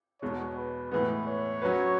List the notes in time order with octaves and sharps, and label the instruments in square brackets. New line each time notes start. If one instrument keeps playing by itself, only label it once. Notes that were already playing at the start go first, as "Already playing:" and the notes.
[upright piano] E2 B2 G#3 [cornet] C#5
[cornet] B4
[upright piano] A2 E3 G#3 B3 [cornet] B4
[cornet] C#5
[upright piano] F#3 C#4 F#4 B4